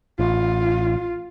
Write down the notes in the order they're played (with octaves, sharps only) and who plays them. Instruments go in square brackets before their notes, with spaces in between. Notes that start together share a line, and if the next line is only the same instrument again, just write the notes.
[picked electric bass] A1 [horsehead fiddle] F4